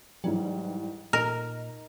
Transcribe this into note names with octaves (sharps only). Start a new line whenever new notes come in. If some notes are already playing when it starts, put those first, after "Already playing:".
G#2 E3 F#3 G3
A#2 D#4 A#4